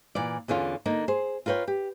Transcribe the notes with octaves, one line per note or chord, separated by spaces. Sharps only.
A#2 E3 D5
E2 D3 C#4 F4
D3 A#3 D#4
G#4 C5
F4 A#4 B4 C#5 G5
G4